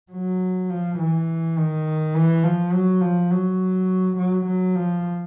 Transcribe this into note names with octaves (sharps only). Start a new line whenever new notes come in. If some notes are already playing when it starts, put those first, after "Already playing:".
F#3
F3
E3
D#3
E3
F3
F#3
F3
F#3
F#3
F#3
F3